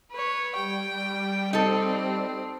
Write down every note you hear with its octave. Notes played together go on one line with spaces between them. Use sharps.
B4 C#5
G3 G5
C4 D#4 A4